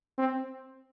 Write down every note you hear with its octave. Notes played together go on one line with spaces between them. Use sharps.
C4